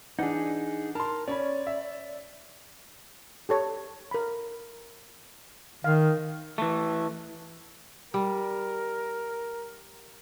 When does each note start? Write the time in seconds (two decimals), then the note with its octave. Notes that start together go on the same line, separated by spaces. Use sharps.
0.19 E3 D4 D#4 G#4 F#5
0.95 A#4 A5 C6
1.28 C#4 C#5 D5 B5
1.67 E5
3.49 G4 A4 C#5
4.11 A#4 B5
5.84 D#3 F5
6.58 E3 A3
8.14 G3 A#4